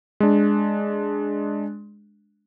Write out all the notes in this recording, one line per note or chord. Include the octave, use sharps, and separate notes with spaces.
G#3 D4